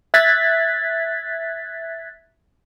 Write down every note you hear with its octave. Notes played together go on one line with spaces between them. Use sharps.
E5 F#6 G#6 A6 B6